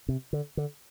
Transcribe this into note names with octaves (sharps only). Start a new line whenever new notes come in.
C3
D3
D3